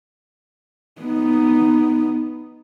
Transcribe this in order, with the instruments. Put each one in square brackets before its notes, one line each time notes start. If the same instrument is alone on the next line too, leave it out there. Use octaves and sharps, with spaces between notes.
[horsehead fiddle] B3 D#4